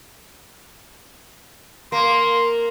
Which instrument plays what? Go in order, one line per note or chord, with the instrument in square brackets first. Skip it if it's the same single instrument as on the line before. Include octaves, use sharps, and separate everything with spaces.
[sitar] A#3 [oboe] C6